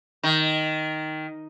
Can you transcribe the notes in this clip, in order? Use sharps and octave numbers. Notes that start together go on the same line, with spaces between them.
D#3